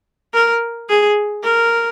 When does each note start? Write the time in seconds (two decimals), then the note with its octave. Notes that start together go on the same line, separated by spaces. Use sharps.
0.34 A#4
0.89 G#4
1.44 A#4